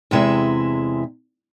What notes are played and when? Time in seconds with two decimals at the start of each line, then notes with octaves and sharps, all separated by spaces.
0.11 E2 C3 G#3 E4 E5